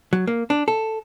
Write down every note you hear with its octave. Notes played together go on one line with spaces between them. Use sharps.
F#3
A#3
D4
A4